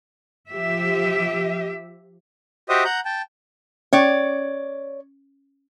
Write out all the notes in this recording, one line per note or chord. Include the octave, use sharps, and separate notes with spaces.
F3 G4 E5
F#4 G4 C5 D#5 E5 D#6
F#5 A#5 G6
G5 A5
C#4 C#5 D5